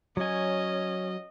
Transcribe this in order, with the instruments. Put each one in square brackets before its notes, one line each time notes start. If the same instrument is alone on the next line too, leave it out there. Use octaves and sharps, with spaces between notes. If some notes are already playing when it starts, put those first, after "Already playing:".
[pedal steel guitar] F#3 G#5 [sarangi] C#4 [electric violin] D#5